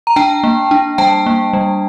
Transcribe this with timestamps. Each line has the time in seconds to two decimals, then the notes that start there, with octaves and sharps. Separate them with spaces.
0.07 A#5
0.16 D4 G5 A5
0.44 A#3
0.71 D4
0.98 G3 G5 A5
1.26 A#3
1.53 G3